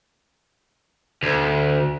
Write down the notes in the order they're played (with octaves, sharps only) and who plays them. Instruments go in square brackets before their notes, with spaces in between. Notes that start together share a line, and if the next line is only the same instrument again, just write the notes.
[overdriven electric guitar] D2